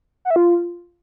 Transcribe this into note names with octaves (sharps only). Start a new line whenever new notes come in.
F#5
E5
F4